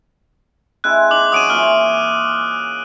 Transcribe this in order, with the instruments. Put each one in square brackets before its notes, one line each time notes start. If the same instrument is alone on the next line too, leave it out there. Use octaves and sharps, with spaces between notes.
[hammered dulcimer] G#3 C4 E4 [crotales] F#6
[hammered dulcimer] D#4 [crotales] D6 F#7
[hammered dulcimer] F#3 C#4 [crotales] D#6 D7 D#7
[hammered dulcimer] E3 A#3 F4 [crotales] F6